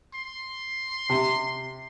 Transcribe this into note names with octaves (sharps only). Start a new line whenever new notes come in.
C6
C3